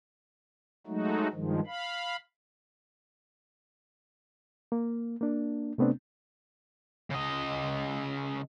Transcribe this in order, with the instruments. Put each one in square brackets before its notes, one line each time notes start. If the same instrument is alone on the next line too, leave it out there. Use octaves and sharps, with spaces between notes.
[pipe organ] F#3 G#3 A3 D#4 F#4
G2 D#3 F3 G#3
F5 B5
[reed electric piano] A#3
A#3 D4
C3 A3 B3 C4 D4
[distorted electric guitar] C#3 D#5